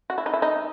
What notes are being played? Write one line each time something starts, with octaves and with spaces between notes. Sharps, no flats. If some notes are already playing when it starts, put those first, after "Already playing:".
F#4
E4
D#4
E4
D#4